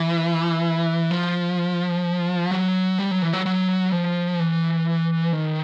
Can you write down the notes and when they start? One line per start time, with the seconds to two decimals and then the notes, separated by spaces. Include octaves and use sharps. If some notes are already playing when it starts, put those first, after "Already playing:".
Already playing: E3
1.11 F3
2.51 F#3
2.99 G3
3.11 F#3
3.22 E3
3.33 F#3
3.46 F#3
3.92 F3
4.40 E3
5.33 D#3